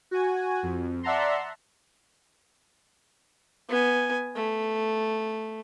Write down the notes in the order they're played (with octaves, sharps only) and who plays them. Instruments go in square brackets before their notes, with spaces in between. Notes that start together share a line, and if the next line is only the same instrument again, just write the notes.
[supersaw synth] F#4 G#5
F2
D5 E5 F#5 A5 A#5 C6
[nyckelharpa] B3 G#5
A3